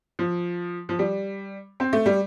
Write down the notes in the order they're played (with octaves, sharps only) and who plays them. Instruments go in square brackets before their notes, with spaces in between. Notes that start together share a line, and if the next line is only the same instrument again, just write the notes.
[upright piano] F3
F3
G3
C4
A3
G3